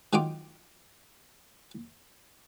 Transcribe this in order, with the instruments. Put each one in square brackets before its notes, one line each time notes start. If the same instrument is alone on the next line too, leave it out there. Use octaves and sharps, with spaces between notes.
[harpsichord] D#3 F#3 D#4 F4 G5 D6